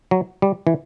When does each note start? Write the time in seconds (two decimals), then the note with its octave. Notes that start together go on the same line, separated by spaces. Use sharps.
0.11 F#3
0.42 G3
0.67 E3